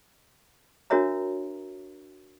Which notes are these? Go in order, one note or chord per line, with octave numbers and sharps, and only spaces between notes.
D4 F#4 A#4 C#5 E5 A#5